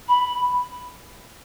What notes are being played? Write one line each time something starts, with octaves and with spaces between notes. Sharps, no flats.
B5